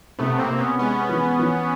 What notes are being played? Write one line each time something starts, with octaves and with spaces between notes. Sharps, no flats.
C3 A3 B3
A#3 C4
C3
B3 C#4
G#3 B3 C#4
E3
E3